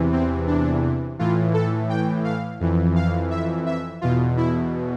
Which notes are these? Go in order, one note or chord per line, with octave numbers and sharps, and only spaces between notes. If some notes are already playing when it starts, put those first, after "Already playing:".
Already playing: E2 C3 E3
C4
D4
A2 E3 F4
A4
G5
F5
F2 E3
F5
E5
E5
E2 B2 F4
E4